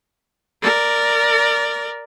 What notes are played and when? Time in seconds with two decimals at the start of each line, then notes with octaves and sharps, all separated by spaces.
0.62 A#4 D5